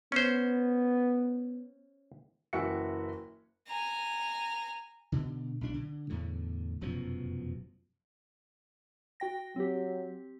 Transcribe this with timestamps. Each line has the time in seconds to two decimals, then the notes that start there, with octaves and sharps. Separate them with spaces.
0.12 B3 C#4 C5
2.53 F#1 E3 F#4 E5 G5 C#7
3.67 G#5 A#5
5.12 B2 D3
5.61 B1 D4
5.74 D3
6.10 E2 A2 D3
6.81 F1 F#2 B2 F3
9.20 F#4 G5 A#6
9.56 F#3 C4 G4